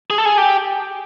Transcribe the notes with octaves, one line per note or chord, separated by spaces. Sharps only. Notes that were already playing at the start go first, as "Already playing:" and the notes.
G#4
A4
G#4
G4